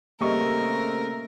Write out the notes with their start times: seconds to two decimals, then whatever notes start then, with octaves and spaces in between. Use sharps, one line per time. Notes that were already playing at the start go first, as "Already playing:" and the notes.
0.21 C#3 G3 A3 A#3 C4 A#4 D#5 C#6